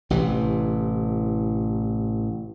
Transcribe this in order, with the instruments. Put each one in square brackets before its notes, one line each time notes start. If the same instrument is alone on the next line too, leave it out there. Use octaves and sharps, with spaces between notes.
[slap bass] A1 C3 E3